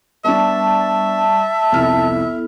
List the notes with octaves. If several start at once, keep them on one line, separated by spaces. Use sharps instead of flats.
G3 B3 D4 D5 E5 A5 C#6
C2 F2 B3 E4 A4 F6